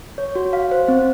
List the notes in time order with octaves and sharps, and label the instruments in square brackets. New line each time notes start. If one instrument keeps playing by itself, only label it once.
[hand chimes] C#5
F#4
F5
C5
C4